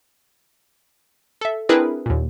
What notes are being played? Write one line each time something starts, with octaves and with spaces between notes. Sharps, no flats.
A4 E5
C4 D4 E4 G#4 A#4 B4
D#2 A#2